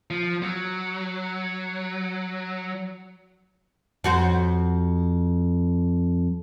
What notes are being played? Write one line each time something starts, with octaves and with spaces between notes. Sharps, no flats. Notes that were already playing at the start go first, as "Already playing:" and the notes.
F3
F#3
F2 F#4 C5